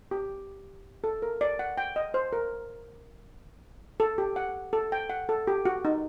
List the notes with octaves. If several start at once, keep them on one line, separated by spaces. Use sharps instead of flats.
G4
A4
A#4
D5
F#5
G5
D#5
C5
A#4
A4
G4
F#5
A4
G5
F#5
A4
G4
F#4
D#4